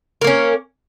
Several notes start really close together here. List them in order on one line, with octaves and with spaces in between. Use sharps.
A#4 A#3 C#4